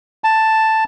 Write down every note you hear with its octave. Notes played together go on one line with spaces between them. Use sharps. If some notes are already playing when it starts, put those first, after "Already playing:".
A5